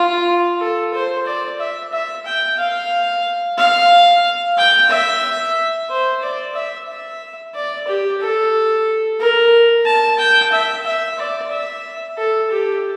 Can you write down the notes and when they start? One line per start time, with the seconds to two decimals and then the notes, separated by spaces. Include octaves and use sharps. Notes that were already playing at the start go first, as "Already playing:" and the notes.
Already playing: F4
0.60 A4
0.94 C5
1.26 D5
1.59 E5
1.92 E5
2.25 G5
2.58 F5
3.58 F5
4.57 G5
4.89 E5
5.90 C5
6.22 D5
6.55 E5
6.88 E5
7.54 D5
7.88 G4
8.20 A4
9.20 A#4
9.86 A5
10.19 G5
10.51 E5
10.85 E5
11.18 D5
11.51 E5
12.17 A4
12.51 G4